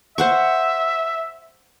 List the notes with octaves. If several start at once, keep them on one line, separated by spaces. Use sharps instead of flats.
C5 E5 F#5 C#6